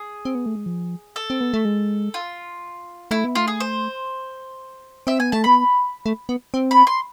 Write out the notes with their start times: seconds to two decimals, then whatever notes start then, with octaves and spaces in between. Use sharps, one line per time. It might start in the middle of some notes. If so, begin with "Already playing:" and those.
Already playing: G#4
0.25 C4
0.35 B3
0.46 A3
0.56 G#3
0.66 F3
1.16 A4
1.30 C4
1.41 B3
1.54 A3
1.65 G#3
2.14 F4
3.11 A3 E4
3.24 B3
3.35 A3 F4
3.48 G#4
3.60 C5
5.07 C4 E5
5.20 B3 G#5
5.32 A3 A5
5.44 B3 B5
6.06 A3
6.29 B3
6.54 C4
6.71 B5
6.87 C6